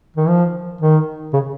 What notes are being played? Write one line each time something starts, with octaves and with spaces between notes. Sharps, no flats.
D#3
F3
D#3
C#3